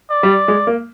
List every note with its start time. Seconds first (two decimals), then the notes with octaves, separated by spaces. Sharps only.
0.11 D5
0.23 G3
0.48 G#3
0.67 A#3